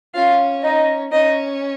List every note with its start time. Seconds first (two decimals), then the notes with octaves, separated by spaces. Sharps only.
0.15 C#4 F4 F5
0.63 D#4 D#5
1.12 C#4 D#4 D#5